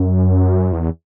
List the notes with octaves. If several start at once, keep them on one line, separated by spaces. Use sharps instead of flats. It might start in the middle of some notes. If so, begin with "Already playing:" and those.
Already playing: F#2
E2